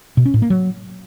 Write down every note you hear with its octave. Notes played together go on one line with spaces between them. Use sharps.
B2
C#4
A2
A#3
F#3